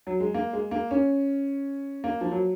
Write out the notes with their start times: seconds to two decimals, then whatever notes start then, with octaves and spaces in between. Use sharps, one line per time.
0.07 F#3
0.20 G#3
0.34 A#3
0.53 G#3
0.71 A#3
0.91 C#4
2.04 A#3
2.21 F3
2.32 F#3